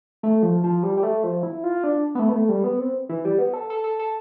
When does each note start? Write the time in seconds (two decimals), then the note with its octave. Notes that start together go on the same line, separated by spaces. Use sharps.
0.23 A3
0.43 F3
0.64 F3
0.83 G3
0.97 G3
1.03 A3
1.24 F3
1.43 E4
1.64 F4
1.84 D4
2.15 B3
2.19 A3
2.29 B3
2.33 A3
2.49 G3
2.64 B3
2.79 C4
3.09 E3
3.25 G3
3.39 B3
3.54 A4
3.70 A4
3.84 A4
3.99 A4